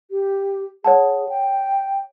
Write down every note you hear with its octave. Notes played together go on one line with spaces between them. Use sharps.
G4
G#4 C#5 F#5 A5
G5